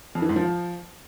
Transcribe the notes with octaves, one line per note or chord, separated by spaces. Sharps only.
F2
E3
G#2
F3